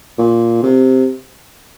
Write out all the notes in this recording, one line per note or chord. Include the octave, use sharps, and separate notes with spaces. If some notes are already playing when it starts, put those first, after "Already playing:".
A#2
C3